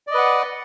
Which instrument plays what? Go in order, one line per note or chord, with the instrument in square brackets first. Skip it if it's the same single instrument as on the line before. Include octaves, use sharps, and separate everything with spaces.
[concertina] D5
D#5
B4
F#5